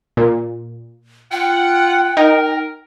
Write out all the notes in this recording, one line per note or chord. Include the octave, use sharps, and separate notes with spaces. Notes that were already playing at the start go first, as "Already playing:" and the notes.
A#2
F4 F#5 G5
D#4 A#4